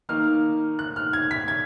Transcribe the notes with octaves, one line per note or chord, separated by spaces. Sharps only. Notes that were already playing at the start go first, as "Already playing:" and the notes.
D#3 A#3 D#4 F6
F#6
F6
G#6
B6
G#6